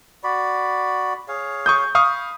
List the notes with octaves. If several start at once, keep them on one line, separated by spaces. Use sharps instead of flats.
F#4 D5 B5
G#4 C#5 F5
C#6 D#6 G6
F5 B5 C#6 D#6